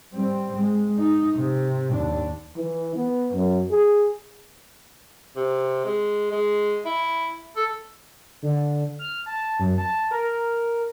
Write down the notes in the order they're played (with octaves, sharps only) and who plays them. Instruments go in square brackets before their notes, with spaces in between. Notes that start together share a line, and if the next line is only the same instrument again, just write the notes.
[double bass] G3 C4
G#3
D#4
C3
D#2 D4
[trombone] E3
B3
F#2
G#4
[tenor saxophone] C3
G#3
G#3
E4
A4
[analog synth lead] D3
F6
A5
F#2
A5
A#4